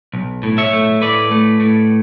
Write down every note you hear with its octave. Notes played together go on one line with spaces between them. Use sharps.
B1
A2
C#5 E5
A3
A2 B4 D5
A3
A2